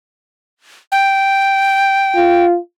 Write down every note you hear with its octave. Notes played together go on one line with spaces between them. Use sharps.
G5
F4